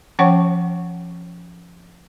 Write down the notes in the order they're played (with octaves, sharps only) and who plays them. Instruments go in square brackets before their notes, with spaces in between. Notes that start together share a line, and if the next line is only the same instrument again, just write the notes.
[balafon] F3 C#4 C#5 F#5 G5 C#6